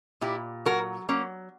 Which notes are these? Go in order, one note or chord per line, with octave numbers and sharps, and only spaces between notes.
A#2 E4 G4
F#3 F#4 A#4
F#3 A#3 C#4